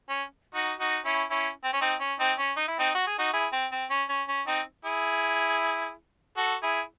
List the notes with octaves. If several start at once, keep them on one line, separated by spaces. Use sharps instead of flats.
C#4
D#4 F#4
D#4 F#4
C#4 E4
C#4 E4
C4
C#4
C4 D#4
C#4
C4 D#4
C#4
D#4
E4
C4 D#4
F#4
G#4
D#4 F#4
E4 G#4
C4
C4
C#4
C#4
C#4
C4 D#4
E4 G#4
F#4 A4
E4 G#4